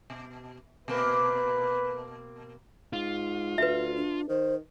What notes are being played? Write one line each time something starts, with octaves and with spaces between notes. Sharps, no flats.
B2
B2 A#3 C4 B4
G#2 F4
D2 B4 E5
D4
D#3 C5